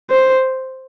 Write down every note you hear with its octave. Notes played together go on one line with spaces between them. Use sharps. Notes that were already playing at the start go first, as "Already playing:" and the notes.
C5